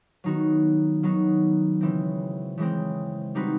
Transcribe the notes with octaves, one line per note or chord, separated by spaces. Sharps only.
D#3 F#3 B3 D#4 F#4
D#3 F#3 B3 D#4 F#4
C#3 E3 G#3 C4
C#3 E3 G#3 C4
G3 C4 D#4 F#4 B4